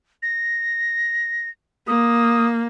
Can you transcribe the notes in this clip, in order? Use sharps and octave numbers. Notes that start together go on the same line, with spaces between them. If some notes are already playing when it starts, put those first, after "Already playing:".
A#6
A#3 D#6